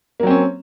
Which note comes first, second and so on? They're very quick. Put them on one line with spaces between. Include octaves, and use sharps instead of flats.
A#3 F#3 C4 C#4